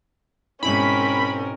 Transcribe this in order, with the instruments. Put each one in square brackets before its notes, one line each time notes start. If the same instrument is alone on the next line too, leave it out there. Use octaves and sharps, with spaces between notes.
[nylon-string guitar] G#2 B2 E4 [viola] C4 A#4 [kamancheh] C#4 [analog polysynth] B5